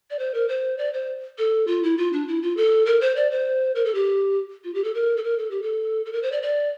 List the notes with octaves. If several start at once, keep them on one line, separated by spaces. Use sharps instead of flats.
D5
C5
A#4
C5
D5
C5
A4
F4
E4
F4
D4
E4
F4
A4
A#4
C5
D5
C5
A#4
A4
G4
F4
G4
A4
A#4
A4
A#4
A4
G4
A4
A4
A#4
C5
D5
D5